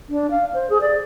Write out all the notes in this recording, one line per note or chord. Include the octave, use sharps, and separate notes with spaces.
D4
F5
C5
G#4
D5